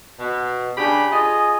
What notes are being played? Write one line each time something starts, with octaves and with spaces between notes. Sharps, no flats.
B2
C#3 D4 G4 B5
F4 G#4 D#5